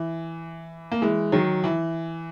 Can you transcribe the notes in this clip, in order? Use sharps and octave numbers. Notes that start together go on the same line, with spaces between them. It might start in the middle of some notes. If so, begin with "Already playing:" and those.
Already playing: E3
A#3
E3 G#3
D#3 F#3
E3